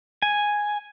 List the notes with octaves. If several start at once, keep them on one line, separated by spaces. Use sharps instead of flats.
G#5